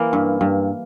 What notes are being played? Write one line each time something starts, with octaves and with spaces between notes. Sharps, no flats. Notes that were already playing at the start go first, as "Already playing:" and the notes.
Already playing: E3 A#3
G2
G2